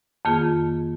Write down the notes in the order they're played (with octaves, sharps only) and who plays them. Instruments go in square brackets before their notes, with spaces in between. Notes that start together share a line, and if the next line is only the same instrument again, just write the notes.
[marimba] F2 D#3 A#3 F4 G#4